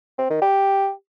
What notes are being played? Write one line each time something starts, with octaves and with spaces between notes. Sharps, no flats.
C4
D#3
G4